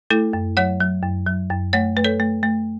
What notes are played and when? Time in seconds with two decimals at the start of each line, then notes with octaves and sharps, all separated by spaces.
0.11 A3 E4 A4
0.33 F#2
0.57 F#3 C#5 F#5
0.80 F#3
1.03 F#2
1.27 F#3
1.50 F#2
1.73 A3 C#5 F#5
1.96 A3 B4
2.04 A4 C#5
2.20 A3
2.43 A3